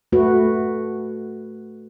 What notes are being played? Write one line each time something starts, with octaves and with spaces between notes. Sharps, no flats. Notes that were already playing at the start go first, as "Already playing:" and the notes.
A3 F#4 B4